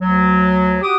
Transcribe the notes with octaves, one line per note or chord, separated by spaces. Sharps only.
D2 F#3
F#4 G4 D6 D#6